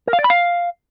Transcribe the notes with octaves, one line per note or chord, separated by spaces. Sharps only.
A#4
F5
D5
B5
F5